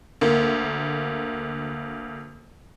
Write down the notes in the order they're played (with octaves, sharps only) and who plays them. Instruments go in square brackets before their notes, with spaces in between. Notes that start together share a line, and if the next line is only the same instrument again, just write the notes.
[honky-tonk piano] D2 A#3